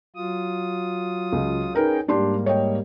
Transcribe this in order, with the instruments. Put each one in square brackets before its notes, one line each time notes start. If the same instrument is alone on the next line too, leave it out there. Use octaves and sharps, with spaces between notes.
[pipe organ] F#3 F4 D#6
[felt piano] C#2
[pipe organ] C#4 G#4 G5 [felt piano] D#4 A#4 B4
[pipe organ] G#2 G3 A#3 [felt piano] D4 G4 C6
[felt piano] C#5 D#5 G5